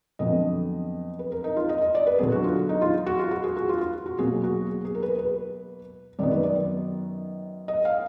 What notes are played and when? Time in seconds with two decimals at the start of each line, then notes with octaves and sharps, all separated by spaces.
0.19 F2 D3 F#3 B3 D#5
1.19 B4
1.32 A#4
1.44 D#4
1.57 F4
1.69 D#5
1.81 D#5
1.95 D5
2.07 B4
2.19 D3 F#3 B3 G#4
2.32 F#4
2.44 F4
2.69 D#4
2.82 F4
3.06 F#4
3.19 F4
3.31 F#4
3.44 G#4
3.57 F#4
3.69 F4
3.81 F4
4.06 F#4
4.19 B2 F#3 A#3 G#4
4.44 F#4
4.69 G#4
4.85 G#4
4.95 A#4
5.03 B4
5.19 B4
6.19 F#2 D#3 F#3 B3 D5
6.31 B4
6.44 D5
7.68 D#5
7.85 F5